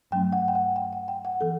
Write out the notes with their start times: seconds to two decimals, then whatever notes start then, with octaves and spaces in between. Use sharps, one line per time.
0.11 G2 F#3 A3 C#4 G5
0.33 F#5
0.48 G5
0.55 F#5
0.76 G5
0.93 F#5
1.08 G5
1.25 F#5
1.41 E3 B3 A4